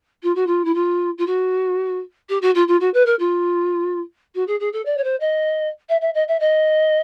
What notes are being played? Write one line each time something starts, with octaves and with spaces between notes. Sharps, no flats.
F4
F#4
F4
E4
F4
F4
F#4
G4
F#4
F4
F4
F#4
B4
A#4
F4
F#4
G#4
G#4
A4
D5
C#5
C5
D#5
E5
E5
D#5
E5
D#5